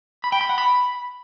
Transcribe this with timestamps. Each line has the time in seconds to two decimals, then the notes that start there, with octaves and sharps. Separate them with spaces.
0.24 B5
0.32 G5
0.41 B5
0.49 F#5
0.58 B5